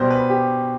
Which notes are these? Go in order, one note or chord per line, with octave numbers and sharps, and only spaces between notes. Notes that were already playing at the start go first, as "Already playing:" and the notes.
Already playing: B2 G3 C5
B4
G4